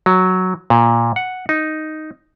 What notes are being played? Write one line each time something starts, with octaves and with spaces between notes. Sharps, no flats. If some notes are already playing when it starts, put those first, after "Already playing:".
F#3
A#2
F#5
D#4